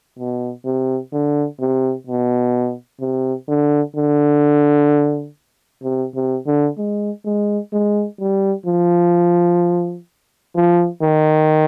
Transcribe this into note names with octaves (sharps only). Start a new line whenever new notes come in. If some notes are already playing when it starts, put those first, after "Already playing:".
B2
C3
D3
C3
B2
C3
D3
D3
C3
C3
D3
G#3
G#3
G#3
G3
F3
F3
D#3